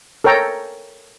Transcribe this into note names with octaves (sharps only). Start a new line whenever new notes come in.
A4 A#4 C#5 G5 A#5